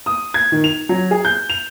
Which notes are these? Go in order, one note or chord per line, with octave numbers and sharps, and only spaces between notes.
D#6
G#6
D#3
F7
F#3
G#4
G6
F7